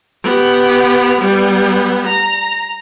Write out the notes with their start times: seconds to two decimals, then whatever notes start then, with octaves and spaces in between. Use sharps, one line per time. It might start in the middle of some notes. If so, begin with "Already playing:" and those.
0.23 B3 G4
1.21 G3 B3
2.07 A#5